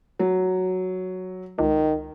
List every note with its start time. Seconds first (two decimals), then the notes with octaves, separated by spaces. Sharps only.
0.19 F#3
1.59 C#2 D#3